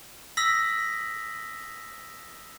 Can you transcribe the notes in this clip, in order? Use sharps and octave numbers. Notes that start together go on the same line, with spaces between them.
D#6 E6 A#6 B6 F#7